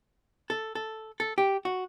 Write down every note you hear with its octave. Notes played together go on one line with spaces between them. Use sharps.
A4
A4
A4
G4
F#4